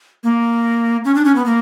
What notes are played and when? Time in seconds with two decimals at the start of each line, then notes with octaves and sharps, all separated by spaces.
0.24 A#3
1.05 C#4
1.15 D4
1.25 C#4
1.36 B3
1.46 A#3